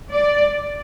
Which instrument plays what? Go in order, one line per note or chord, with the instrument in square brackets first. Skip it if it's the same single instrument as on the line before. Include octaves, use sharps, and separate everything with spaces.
[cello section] D5